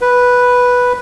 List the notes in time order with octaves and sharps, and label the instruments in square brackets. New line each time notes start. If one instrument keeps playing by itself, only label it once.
[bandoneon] B4